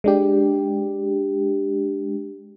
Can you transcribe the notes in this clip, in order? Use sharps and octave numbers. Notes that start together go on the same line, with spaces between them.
G#3 D4 G4